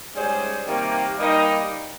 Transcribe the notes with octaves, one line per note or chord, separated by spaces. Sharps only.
G#2 G3 C#4 G#4 C5
C3 D#3 G3 A#3
G3 A#3 D#4 A#4 D#5